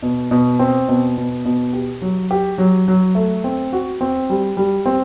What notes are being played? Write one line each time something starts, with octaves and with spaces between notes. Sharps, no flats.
B2
B2
C4
B2
B2
B2
G4
F#3
G4
F#3
F#3
A3
C4
F#4
C4
G3
G3
C4